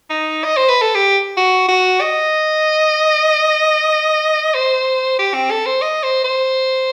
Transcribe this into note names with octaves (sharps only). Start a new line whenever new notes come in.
D#4
D#5
C5
B4
A4
G4
F#4
F#4
D#5
C5
G4
C4
A4
C5
D#5
C5
C5